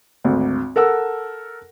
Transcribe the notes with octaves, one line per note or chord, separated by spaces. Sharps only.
G#1 D2
A4 A#4 F#5 E6